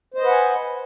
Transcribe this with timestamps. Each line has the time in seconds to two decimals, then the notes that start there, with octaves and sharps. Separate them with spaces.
0.14 C5
0.18 D#5
0.22 B4
0.27 F#5
0.31 G#5